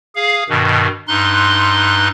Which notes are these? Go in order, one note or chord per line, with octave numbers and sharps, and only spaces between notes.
G#4 F5
G2 B2 D#3
G2 D#4 C6 F#6